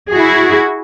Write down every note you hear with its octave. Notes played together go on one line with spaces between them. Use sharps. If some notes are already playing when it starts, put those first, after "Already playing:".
E4 F#4 G#4